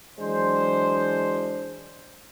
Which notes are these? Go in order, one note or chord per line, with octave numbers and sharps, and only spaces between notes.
E3 F#3 G#3 D4 C5